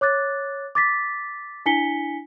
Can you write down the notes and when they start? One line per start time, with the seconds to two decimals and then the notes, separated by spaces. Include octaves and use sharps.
0.01 C#5 D6 F#6 A6
0.75 D6 A6 B6
1.66 D4 E4 G#5 B6 C#7 G7